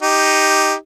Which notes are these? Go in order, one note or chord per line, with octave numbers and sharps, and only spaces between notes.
D#4 G4